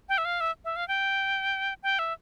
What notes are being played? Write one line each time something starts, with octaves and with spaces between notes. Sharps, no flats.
G5
E5
F5
E5
E5
F5
G5
G5
E5